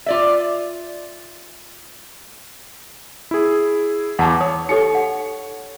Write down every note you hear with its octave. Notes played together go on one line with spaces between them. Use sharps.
F4 D5 E5
E4 G#4
E2 F#5 A5 D6
C#5 D#6
D#4 G4 A4 C#5 C#7
F#5